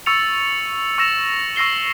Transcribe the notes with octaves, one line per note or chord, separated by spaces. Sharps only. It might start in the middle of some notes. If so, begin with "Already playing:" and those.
C#6 E6 A6 C#7 F7
C#6 E6 A#6 E7 F7
C#6 E6 A#6 C7 G7